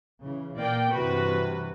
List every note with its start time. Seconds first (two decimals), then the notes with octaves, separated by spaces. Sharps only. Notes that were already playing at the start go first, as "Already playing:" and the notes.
0.22 C#3 E3
0.60 A#2 A#3 D5 G5
0.92 G2 C3 E3 F#4 B4